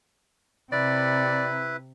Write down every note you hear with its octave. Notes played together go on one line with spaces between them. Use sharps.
C3 E4 B4 D5